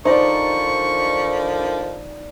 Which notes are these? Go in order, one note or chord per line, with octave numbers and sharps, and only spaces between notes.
D3 D#3 F3 D#4 C5 D5 C#6